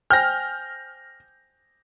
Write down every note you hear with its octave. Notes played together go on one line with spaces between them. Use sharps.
C5 G5 G#5 F6 G6 A#6